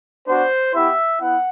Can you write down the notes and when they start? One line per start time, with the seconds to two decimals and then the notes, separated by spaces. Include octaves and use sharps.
0.26 B3 D4 F#4 C5
0.73 B3 E4 G4 E5
1.20 B3 E4 F#5